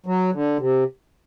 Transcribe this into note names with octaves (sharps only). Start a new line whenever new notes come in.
F#3
D3
C3